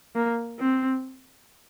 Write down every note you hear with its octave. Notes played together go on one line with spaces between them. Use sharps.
A#3
C4